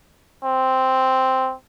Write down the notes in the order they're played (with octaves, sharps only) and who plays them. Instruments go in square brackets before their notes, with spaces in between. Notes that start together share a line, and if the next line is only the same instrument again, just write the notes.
[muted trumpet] C4